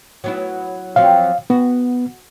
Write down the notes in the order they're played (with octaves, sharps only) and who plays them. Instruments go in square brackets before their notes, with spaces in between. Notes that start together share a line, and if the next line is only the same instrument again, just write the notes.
[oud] F#3 B3 E4
[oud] F3 F#3 C4 [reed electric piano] F5
[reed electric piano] B3 [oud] F#4